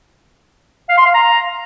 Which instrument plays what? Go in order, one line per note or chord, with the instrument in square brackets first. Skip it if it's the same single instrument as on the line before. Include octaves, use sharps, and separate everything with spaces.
[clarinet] F5
C6
F5
A#5